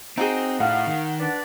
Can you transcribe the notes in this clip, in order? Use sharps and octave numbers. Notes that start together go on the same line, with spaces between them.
C4 D#4 F#4 G#4
A2 A3 F5 F#5
D#3
D4 B4 D5